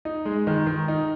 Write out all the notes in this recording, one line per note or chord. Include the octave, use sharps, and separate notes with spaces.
D#4
G#3
D#3
D#3
D#4